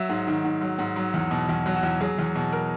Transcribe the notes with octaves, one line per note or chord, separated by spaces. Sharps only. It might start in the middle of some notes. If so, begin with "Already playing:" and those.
Already playing: F#3 E5
G#2
D#3
G#2
F#3
G#2
F#3
E2
B2
E2
F#3
F#4
E2
F#3 G#4
E2
B2
A#4